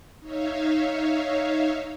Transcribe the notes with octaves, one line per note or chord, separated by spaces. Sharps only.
D#4 C#5 E5 F5